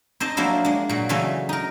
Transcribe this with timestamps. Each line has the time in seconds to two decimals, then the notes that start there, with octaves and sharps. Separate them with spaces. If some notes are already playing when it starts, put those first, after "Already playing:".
0.20 C4 D#4 C5 D#5 A5
0.37 F3 F#3 A#3 C4 D4 E4
0.65 G#3 D4
0.89 A#2 F#3
1.09 C#3 E3 F#3 A3 C#4
1.49 D#4 A#4